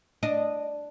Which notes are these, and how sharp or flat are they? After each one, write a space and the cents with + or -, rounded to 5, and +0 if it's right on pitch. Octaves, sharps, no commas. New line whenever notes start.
D4 +0 D#5 -10